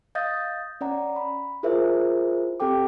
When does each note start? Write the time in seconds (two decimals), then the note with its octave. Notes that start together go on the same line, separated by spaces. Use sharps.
0.15 D#5 F5 D#6 G6 A6 A#6
0.81 C#4 D5 F#5 A#5
1.16 B5
1.63 E4 F4 G#4 A#4 C5 E5
2.60 C4 G4 A4 G5 D6